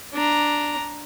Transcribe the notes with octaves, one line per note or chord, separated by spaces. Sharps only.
D4 A#5